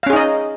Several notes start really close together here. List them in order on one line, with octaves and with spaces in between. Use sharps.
F5 C#4 G#4 D#4 D#5